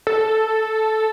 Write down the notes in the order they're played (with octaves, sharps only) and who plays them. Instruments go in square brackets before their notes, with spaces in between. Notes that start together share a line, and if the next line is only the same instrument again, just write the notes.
[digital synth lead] A4